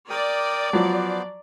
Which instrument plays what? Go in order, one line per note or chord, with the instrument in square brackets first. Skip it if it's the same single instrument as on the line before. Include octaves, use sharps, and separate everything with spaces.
[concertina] A#4 G5 D#6 [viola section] D5
[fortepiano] F3 F#3 [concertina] B3 C5